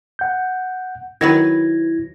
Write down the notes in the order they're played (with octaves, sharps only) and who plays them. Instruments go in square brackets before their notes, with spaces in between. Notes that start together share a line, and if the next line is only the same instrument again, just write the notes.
[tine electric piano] F#5 G6
[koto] D#3 F#3 B4 [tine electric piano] E4 G#6 A#6